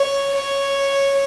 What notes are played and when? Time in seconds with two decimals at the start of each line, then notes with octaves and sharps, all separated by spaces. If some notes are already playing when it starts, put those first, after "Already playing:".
Already playing: C#5
0.36 C#5